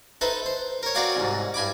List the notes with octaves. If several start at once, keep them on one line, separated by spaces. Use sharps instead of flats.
D#4 A4 B4 C5 E5
C5
A#4 C#5
C4 F#4 A#4 D5 F5 G#5
C2 G#2
G2 G#5 B5 D6